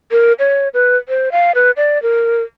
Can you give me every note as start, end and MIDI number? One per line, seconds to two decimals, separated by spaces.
0.11 0.33 70
0.39 0.68 73
0.74 0.97 71
1.09 1.29 72
1.32 1.52 77
1.55 1.71 71
1.77 2.01 74
2.02 2.42 70